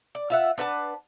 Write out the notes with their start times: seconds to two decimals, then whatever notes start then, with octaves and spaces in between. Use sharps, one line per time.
0.15 D5
0.30 F4 E5 F#5
0.58 D4 B4 F#5 A5